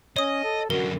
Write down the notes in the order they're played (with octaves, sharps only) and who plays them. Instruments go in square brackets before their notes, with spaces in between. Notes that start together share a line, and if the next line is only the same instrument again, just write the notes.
[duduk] C#4 [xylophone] C#5 D#6 [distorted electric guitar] D#5
[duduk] A4
[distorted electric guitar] F#2 D3 [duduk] F#4 [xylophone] A#4